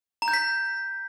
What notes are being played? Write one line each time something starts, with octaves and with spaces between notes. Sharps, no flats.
A#5
G6
B6